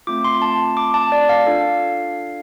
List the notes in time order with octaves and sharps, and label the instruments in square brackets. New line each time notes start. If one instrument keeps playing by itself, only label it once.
[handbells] A3 C4 F4 D6
C6
A5
D6
A5
D5
F5
D4 F4 A4